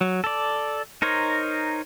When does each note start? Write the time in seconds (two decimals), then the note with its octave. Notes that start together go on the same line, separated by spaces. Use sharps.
0.01 F#3
0.24 A4 D5
1.02 D#4 A#4 C5 C#5